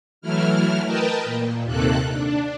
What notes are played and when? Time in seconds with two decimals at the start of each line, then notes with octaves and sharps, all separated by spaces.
0.21 E3 F#3 A3 E4 F6
0.85 A#4 B4 D#5 G5 A5
1.25 A#2
1.64 D#2 C3 D#3 A#3 A4 F#6
2.10 D4